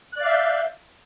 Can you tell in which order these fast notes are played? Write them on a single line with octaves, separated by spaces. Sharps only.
F#6 D5 F5 E5 G6